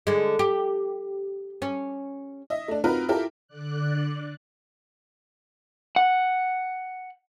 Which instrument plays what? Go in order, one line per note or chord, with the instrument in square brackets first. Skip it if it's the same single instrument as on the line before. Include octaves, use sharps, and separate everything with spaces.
[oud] D3 G#3
G4
C#4
[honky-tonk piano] D#5 E5
A3 D4
C4 D#4 F4 F#4 A#4 B4
E4 F4 G4 A4 A#4
[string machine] D3 D5 F#6
[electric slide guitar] F#5